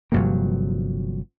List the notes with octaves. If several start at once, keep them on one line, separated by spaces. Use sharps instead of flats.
G1 G2 C3 F3 F#3 A#3